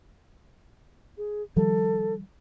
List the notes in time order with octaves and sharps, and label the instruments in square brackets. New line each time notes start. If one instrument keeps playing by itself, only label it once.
[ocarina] G#4
[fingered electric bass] D#3 F3 G3 [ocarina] A4